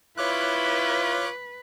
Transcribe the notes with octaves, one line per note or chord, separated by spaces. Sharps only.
E4 F4 B4 C#5 D6 F#6